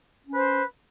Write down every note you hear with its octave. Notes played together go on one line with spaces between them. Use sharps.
C#4 B4 C5